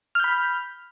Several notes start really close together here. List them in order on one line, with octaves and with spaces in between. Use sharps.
F6 G6 B5